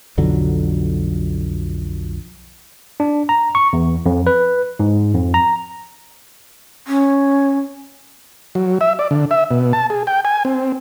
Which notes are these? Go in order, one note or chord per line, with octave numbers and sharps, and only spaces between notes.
B1 F2 D3 F#3
D4
A#5
C#6
E2
F2
B4
G#2
F2
A#5
C#4
F#3
E5
D5
D3
E5
B2
A5
G#4
G5
G#5
C4